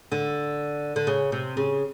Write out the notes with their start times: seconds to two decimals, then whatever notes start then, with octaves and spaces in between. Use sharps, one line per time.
0.12 D3
0.96 D3
1.07 C#3
1.32 C3
1.57 C#3